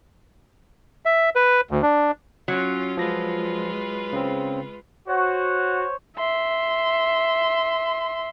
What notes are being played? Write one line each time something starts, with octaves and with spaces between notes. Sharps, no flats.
E5
B4
D2
D4
F#3 C#4 F4
F3 G#3 F4 B4 A#6
C#3 C4
F#4 C5 C#5
E5 C6